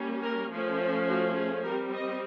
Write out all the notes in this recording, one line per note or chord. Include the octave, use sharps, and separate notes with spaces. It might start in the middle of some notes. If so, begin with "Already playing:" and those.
Already playing: G3 A#3 C#4
A#4
F3 A3 C#4
A4
F#4
G#4
G3 C4 A#4
D#5